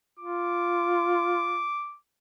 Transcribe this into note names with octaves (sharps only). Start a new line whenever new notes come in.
F4 D6